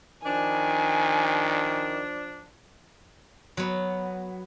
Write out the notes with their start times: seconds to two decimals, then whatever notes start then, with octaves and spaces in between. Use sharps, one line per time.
0.24 D#3 F3 D4 G#5
3.57 F#3 B3